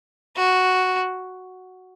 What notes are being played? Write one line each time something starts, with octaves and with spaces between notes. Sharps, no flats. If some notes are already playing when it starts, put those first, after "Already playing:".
F#4